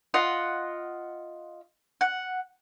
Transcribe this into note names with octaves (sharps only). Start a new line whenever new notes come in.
F4 D#5 F#5
F#5